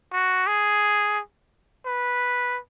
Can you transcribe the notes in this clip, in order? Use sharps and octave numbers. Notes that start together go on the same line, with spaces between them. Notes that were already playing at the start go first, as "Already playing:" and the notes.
F#4
G#4
B4